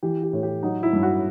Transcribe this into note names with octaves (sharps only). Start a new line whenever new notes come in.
E3 G4
G4
A2
G4
F#3 D#4
E4
G2
F#4